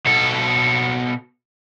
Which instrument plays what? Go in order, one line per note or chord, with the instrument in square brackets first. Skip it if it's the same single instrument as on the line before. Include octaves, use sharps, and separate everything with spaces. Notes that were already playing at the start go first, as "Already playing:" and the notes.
[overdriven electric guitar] B2 A4